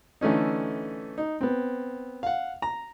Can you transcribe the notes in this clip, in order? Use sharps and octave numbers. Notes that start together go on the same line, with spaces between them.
D3 E3 A3 C#4 D#4
D#4
B3 C4
F5 F#5
A#5